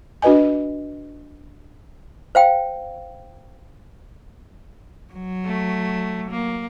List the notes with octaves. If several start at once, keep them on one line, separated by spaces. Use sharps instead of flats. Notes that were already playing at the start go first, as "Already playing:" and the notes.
D4 F#4 B4 D#5 G#5
C5 F5 G5
F#3
A3
A#3